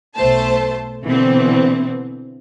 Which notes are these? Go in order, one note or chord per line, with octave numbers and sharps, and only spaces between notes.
B1 A3 C5 A5
B2 D3 E3 B3 C4